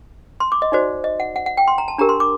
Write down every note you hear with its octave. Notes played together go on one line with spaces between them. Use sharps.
C6
D6
D#5
D#4 F#4 C5 D5
D#5
F#5
F#5
F#5
G5
C6
A#5
A5
D4 G4 A#4 A#5
C6
D6